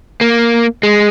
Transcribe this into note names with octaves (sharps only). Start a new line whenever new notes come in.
A#3
G#3